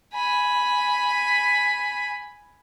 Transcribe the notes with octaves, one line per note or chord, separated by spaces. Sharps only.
G#5 B5